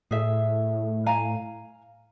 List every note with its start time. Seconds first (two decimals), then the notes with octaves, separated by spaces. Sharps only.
0.11 A2 G#4 E5
1.06 F5 G#5 A#5